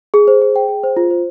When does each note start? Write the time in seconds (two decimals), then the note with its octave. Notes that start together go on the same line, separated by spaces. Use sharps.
0.14 G#4
0.28 C5
0.42 G#4
0.56 G5
0.69 G#4
0.84 C5
0.97 F4
1.11 C5